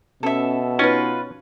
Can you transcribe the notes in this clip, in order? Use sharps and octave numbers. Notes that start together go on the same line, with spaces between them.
B2 C#4 A4 E5
C#4 D#4 F4 B4